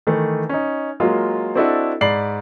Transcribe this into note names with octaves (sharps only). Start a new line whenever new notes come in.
D#3 E3 A3
C#4 D#4
F#3 G#3 A#3 F4
C4 D4 E4 F#4 A4 D#5
G#2 D5 B5 C7 F#7